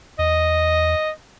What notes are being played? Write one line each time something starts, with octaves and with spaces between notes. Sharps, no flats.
E2 D#5